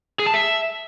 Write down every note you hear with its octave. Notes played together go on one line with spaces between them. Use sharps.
G#4
A5
E5